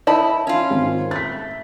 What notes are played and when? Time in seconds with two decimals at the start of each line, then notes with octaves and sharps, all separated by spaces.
0.07 E4 D#5 A5 B5
0.47 C#4 F4
0.70 G#1
1.11 A3 A6 B6